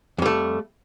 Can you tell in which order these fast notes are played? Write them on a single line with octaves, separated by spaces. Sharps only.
F2 G3 A3